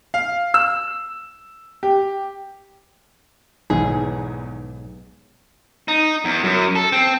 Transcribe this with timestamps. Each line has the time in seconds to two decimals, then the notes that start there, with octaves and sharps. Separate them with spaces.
0.14 F5
0.54 E6
1.83 G4
3.70 B1 E2 G#2 E3 G#4
5.88 D#4
6.25 E2
6.44 F#2
6.75 A4
6.92 C4